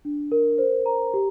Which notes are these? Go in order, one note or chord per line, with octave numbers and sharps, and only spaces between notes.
D4
A#4
C5
A#5
G4